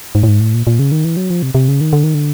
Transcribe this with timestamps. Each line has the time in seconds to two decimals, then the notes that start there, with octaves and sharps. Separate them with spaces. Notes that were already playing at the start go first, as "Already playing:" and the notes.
0.15 G#2
0.23 A2
0.28 G#2
0.40 A2
0.54 A#2
0.67 A#2
0.79 C#3
0.92 D#3
1.05 E3
1.17 F#3
1.30 F3
1.43 C3
1.55 C3
1.68 C#3
1.81 D#3
1.93 D3
2.04 D#3
2.14 D3